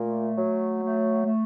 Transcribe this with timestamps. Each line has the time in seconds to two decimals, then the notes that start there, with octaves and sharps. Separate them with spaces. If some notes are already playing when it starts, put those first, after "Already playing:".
Already playing: A#2 A3
0.37 F#3
0.82 A3
1.25 A3